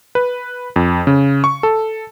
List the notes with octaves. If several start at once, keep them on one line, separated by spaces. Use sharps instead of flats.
B4
F2
C#3
C#6
A4